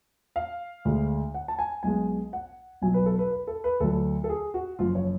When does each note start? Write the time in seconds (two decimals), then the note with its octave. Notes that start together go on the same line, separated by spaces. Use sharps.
0.36 F5
0.85 D2 D3 G#3
1.34 F#5
1.48 A5
1.59 G#5
1.83 B1 B2 G#3 G#5
2.33 F#5
2.82 B1 B2 F#3 G#5
2.94 B4
3.06 A4
3.19 B4
3.31 B4
3.47 A4
3.64 B4
3.80 D2 D3 F#3 A4
4.24 A4
4.29 G#4
4.54 F#4
4.79 F#1 F#2 F3 F4
4.95 C#5